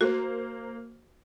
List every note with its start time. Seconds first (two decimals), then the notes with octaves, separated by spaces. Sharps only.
0.01 A#3 F#4 A#4 C5